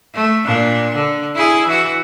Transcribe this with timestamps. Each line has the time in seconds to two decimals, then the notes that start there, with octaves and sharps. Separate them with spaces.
0.14 A3
0.46 A#2 D4
0.95 D3
1.35 E4 G#4
1.67 E3 F#4